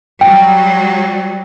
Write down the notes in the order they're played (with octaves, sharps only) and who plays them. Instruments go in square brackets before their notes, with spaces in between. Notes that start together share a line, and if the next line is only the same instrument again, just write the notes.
[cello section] F#3 G3 [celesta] G5